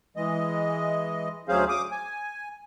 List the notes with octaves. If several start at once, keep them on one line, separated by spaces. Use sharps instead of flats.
E3 G#3 D#5
D2 F#3 C#4 G#4 C5 F5
D6 D#6
G#5